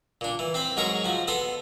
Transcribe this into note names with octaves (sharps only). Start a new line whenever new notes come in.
A#2 D4
E3
C4 C5 B5
G#2 F#3 G#4 A#4 C#6
F3 F#4
B3 A4 C6